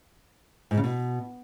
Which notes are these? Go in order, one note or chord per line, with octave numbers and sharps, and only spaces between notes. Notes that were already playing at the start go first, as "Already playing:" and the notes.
G#2
C#3
B2